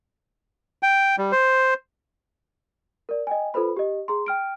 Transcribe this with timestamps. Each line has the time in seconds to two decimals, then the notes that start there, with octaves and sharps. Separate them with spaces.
0.83 G5
1.18 G3
1.32 C5
3.09 A#4 D5
3.27 D#5 G5 G#5
3.54 F4 A4 B4 C5 B5
3.77 G4 D#5
4.08 G#4 A#5 C6
4.26 G5 F6 D7